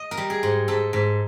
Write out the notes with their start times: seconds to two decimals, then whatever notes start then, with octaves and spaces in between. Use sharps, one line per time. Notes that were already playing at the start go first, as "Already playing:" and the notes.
Already playing: D#5
0.11 A#4
0.17 G3
0.30 G#4
0.43 G#2
0.68 G#2 A4
0.93 G#2